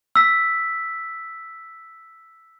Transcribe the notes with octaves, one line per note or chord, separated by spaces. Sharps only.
E6 B6